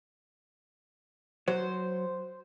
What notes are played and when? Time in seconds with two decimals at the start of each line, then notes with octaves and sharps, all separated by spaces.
1.48 F#3 C5